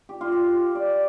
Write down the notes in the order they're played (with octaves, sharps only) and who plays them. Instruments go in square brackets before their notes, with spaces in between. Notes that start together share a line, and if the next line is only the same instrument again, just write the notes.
[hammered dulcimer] G4
F4
G4
D5